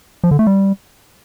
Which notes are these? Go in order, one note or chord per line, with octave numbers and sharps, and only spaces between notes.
F3
D3
A3
G3